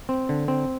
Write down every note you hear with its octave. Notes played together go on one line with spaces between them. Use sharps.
C4
D3
C4